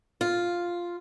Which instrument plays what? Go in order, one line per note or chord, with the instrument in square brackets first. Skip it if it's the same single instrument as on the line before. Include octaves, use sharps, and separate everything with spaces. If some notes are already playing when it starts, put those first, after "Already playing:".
[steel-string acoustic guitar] F4